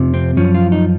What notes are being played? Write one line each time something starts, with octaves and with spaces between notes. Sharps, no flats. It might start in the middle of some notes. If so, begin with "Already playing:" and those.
Already playing: F2 C3 F3
C4
F#2 F3 C#4
F4
D#4